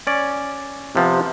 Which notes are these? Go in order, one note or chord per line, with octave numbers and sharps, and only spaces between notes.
C#4 D5
C3 F3 B3